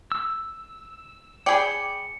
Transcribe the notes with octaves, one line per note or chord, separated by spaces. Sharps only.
E6
G#4 D5 G5 B5 C#7